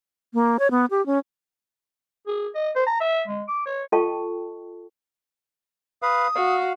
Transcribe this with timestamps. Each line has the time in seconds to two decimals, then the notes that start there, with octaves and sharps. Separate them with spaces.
0.34 A#3
0.59 C#5
0.71 B3
0.91 G4
1.06 C#4
2.27 G#4
2.55 D#5
2.76 C5
2.87 A#5
3.01 E5
3.28 G#3
3.48 D6
3.66 C#5
3.92 F4 A4 D#5 G5 A5 C#6
6.02 B4 F5 D#6
6.36 F#4 F5